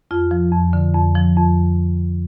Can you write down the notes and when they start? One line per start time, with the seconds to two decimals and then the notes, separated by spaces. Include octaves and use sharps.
0.11 F2 F4
0.31 F3
0.52 F2
0.73 D3
0.95 F2
1.16 F3
1.36 F2